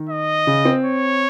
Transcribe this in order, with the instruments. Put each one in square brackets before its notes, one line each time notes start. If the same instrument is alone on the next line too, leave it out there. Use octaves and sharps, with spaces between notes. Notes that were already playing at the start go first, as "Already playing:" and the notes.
Already playing: [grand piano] D#3
[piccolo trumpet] D#5
[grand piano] C#3
C4
[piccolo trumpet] C#5